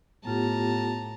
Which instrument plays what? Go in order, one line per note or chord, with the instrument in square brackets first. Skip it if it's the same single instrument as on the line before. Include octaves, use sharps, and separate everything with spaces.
[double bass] A2 [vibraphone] B3 F4 G4 [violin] A5 A#5